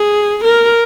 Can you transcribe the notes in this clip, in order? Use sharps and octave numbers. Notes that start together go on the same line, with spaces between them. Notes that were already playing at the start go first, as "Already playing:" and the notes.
Already playing: G#4
A#4